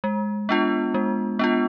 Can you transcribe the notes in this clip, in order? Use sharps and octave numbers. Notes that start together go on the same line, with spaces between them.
G#3
B3 D4 F4
G#3
B3 D4 F4